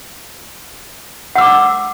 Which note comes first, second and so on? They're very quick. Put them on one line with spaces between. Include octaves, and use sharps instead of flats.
F#5 E6 D6